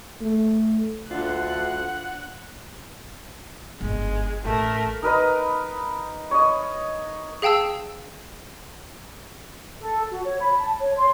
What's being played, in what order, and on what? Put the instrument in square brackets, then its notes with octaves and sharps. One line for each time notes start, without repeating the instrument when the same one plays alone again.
[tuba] A3
[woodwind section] D2 [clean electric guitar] D4 F4 [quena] F#5 [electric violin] F#6
[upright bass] G1 G#2 [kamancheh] G#3
[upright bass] A1 [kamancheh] A3 A#4
[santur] D#4 A#4 B4 D#5
C#5 D#5
[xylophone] G#4 F5 G5 A5 E6
[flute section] A4
F#4
C#5
B5
A5
C#5
C6